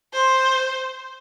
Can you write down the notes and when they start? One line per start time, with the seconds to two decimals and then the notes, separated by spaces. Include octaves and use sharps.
0.13 C5